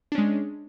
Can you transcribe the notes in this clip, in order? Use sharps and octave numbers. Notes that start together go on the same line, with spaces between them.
G#3 C#4 D4